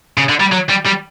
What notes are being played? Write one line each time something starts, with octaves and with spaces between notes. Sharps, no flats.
C#3
D3
G3
F#3
G3
G3